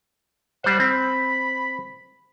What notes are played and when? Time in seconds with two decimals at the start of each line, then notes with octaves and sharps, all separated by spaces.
0.64 G3 C5 F#5
0.80 C4 B5